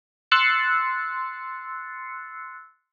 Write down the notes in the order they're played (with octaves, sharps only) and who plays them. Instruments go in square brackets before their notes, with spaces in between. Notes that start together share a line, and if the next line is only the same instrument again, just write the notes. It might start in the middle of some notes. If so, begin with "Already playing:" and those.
[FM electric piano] C6 E6 F#6 A6 C7 C#7